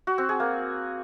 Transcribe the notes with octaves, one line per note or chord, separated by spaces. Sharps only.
F#4
C4
G#4
A#3